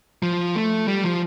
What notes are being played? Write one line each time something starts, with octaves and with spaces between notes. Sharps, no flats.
F3
A3
G3
F3